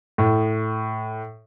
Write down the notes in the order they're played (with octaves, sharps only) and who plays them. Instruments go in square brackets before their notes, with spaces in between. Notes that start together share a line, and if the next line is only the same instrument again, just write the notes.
[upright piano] A2